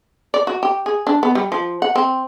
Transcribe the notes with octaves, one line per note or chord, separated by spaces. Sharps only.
D5
F#4
G4
G#4
D4
B3
G3
F3
F#5
C4